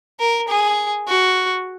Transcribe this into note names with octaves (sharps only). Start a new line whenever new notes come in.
A#4
G#4
F#4